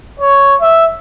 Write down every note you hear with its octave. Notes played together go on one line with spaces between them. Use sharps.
C#5
E5